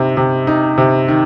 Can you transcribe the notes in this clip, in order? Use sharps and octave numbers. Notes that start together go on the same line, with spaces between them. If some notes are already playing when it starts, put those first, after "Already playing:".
Already playing: C3 D#4
C3
D#4
C3
D#3